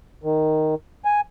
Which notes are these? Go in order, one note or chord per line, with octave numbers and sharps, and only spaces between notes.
D#3
G#5